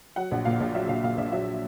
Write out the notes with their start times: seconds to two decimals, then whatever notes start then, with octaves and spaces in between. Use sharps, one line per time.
0.16 F#3 F#5
0.31 A#1
0.45 A#2 F5
0.60 A#1
0.75 F#3 E5
0.89 A#1 F5
1.03 A#2 F5
1.17 A#1 E5
1.32 F#3 E5